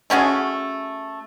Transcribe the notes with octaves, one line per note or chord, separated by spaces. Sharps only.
A3 C#4 F#4 G#4